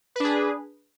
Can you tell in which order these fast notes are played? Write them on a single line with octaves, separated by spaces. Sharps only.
B4 D4 G#4